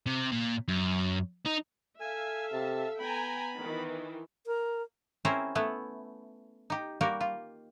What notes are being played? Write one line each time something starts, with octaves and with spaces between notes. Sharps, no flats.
C3
A#2
F#2
D#4
A4 E5 F5 G#5
C3 A5
B3 G5 G#5 A#5 B5
D#3 E3
A#4
C4 C#4 E4 G#4 A#4 C5
A3 B3 E4
D#4 G4
G3 A#3 F#4 G4 A#4
F4